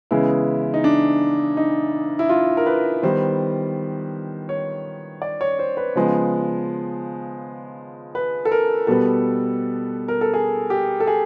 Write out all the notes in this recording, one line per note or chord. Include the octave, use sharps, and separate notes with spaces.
C#3 E3 G#3 B3 E4
D#4
D4
D#4
E4
F4
A#4
B4
D#3 G3 B3 C5
C#5
D5
C#5
C5
B4
C#3 F3 G#3 B3
B4
A4
A#4
B2 G3 B3 A4
A#4
A4
G#4
G4
A4
G#4